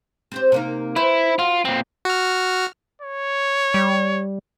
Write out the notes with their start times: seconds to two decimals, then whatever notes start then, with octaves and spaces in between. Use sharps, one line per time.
0.32 C4 G4 C5
0.52 C3 A#3 D#4
0.96 E4 B4 C5
1.39 F4 F#4
1.65 F2 A#2 C4
2.05 F#4 F6
3.01 C#5
3.74 G3